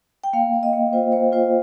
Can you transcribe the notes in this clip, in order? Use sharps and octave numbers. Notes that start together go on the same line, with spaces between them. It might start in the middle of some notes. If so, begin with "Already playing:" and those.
G5
A#3 F5
A#3
D#5
A#3
F4 C5
A#3 C5
F4 C5